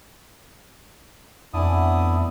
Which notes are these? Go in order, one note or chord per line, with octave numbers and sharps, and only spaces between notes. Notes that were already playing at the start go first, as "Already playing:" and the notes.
F2 A2 E3 B3 D4 E4 D#6